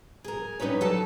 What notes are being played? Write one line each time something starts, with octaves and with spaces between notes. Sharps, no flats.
G#4 A#4
G3 C#4 D#4 B4 C#5
F#3 A4 A5